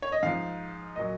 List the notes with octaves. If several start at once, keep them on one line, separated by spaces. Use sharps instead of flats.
C#5
D#5
G#2 F3 F5
A#2 F#3 D#5